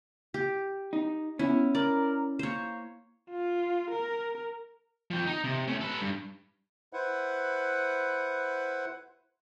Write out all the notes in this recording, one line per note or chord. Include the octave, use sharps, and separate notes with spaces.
G4
D#4
B3 C#4 E4
A#4 D5
A#3 C5 C#5
F4
A#4
F3 G5
D#4
C3
A3 C#4
A4 B4
G2
E4 B4 C5 F#5